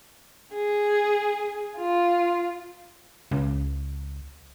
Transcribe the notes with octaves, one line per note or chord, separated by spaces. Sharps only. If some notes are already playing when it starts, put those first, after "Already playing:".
G#4
F4
C#2